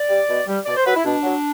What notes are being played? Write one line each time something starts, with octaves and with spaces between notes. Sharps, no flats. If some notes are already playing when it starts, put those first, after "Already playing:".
Already playing: D5
G3
B2
G3
B2 D5
C5
F#3 B4
E4
B2 D4
F#3